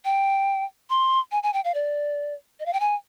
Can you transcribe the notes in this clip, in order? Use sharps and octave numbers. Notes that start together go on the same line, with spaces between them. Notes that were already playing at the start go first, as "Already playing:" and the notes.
G5
C6
G#5
G#5
G5
F5
D5
D#5
F5
G5
G#5